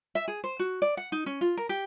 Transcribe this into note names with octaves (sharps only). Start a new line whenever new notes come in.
E5
G#4
C5
F#4
D5
F#5
D#4
C#4
F4
A#4
G4